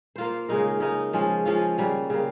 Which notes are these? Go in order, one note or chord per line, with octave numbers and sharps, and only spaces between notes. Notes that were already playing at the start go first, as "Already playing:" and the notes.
A#3 F4 C5
C#3 G#3 D#4 A#4
C#3 G#3 D#4 A#4
F3 G#3 C#4 F4
F3 G#3 C#4 F4
C#3 G3 A#3
C#3 G3 A#3